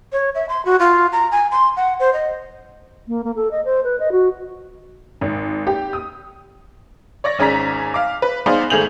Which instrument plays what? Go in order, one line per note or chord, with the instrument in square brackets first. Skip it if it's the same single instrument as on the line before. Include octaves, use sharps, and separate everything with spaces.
[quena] C#5
E5
C6
F#4
F4
A#5
G#5
C6
F#5
C5
D#5
[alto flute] A#3
A#3
A4
D#5
C5
B4
D#5
F#4
[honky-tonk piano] G#1
G4
D#6
C#5 D5 C#6 A#6
G#1 C#4 G#4 D5 A#5 B6
F5 D6
B4
B3 D#4 G#4 C5 D5 F5
G#1 A3 G#4 G6 F7 F#7